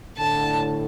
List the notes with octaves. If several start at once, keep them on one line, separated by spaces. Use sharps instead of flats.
A2 D3 A5